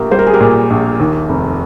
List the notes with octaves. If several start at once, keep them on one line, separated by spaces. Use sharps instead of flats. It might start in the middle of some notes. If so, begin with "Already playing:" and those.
Already playing: A#1 A#3 G4
G3 C5
A#4
G#4
G4 A#4
A#2
A#1
D#2
F1